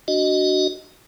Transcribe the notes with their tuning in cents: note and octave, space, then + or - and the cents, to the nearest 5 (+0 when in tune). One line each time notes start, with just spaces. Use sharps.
D4 +0 F#4 +10 D#5 +0